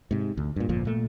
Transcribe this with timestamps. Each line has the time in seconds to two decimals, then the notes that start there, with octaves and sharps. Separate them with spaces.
0.11 G#2 C3
0.37 D2
0.56 G2 A#2
0.69 G1 F2 A#2 F3
0.85 A#2 A3